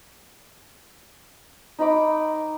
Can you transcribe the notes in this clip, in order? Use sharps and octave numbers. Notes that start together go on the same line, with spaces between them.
D#4 D#5 B5 D6